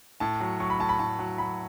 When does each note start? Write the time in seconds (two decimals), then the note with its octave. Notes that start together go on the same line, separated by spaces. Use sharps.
0.20 A2 A5
0.40 F#3
0.60 F#3 C#6
0.70 B5
0.80 A2 A5
0.89 B5
0.99 A2 A5
1.19 F#3
1.38 F#3 B5